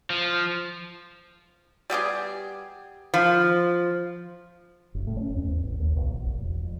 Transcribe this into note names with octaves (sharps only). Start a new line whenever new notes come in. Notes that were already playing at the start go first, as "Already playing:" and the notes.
F3
G3 B3 G4 G#4
F3
F#1
A2
C#4
F2
E2
A1
D#2
B1
A#1
F1
E1
F2